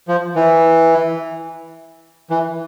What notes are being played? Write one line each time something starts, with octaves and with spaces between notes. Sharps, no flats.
F3
E3
E3